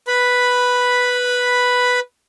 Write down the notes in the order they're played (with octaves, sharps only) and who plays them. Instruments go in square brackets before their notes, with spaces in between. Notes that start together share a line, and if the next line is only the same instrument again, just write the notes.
[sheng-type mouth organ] B4 B5